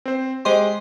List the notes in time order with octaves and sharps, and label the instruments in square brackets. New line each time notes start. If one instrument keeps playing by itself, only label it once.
[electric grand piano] C4 C5
[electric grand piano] G#3 G4 [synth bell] C5 D#5 C6